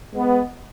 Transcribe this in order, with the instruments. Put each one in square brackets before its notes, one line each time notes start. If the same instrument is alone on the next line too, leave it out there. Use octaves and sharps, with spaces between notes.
[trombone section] G#3 B3